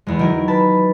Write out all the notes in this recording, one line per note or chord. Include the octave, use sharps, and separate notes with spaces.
E2 G#3
D#3 F#3 E4 A#4
B4 A5